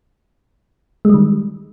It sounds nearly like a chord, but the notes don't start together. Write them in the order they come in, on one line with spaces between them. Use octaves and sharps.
G#3 G3 D#3